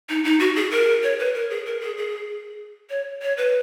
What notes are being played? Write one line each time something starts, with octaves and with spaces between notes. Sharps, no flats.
D#4
D#4
F#4
G#4
A#4
C#5
B4
A#4
G#4
A#4
G#4
G#4
C#5
C#5
B4